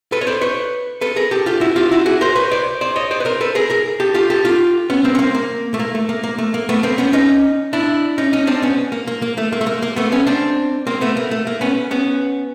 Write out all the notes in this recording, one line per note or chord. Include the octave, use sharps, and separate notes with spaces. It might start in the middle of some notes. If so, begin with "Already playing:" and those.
A4 B4
C#5
C5 D5
B4 C#5
A4 B4
G#4 A#4
G4 A4
F4 G4
E4 F#4
F4 G4
E4 F#4
F#4 G#4
A#4 C5
B4 C#5
C5 D5
C5 D5
C#5 D#5
C5 D5
B4
A#4 C5
A4 B4
G#4 A#4
G#4 A#4
G4 A4
F4 G4
G4 A4
F4 G4
B3 C#4
A#3 C4
C#4
A#3 C4
A#3
A3
A#3
A3
A#3
A#3
A3
A#3
A3 B3
A#3 C4
B3 C#4
C#4 D#4
D4 E4
C#4 D#4
C#4 D#4
C4 D4
B3 C#4
A#3
A#3
A#3
A3
A#3
A3
A#3
A#3
A3 B3
B3 C#4
C4 D4
A#3 C4
A3 B3
A#3
A3
A#3
B3 C#4
B3 C#4